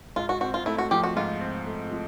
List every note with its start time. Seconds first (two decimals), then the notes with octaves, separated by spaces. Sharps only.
0.16 G#2 F4
0.29 F#4
0.41 C4 F#4
0.54 F4
0.66 A3 E4
0.78 F#4
0.91 F3 G4
1.04 F#4
1.16 G#2 F4
1.41 C4
1.66 A3
1.91 F3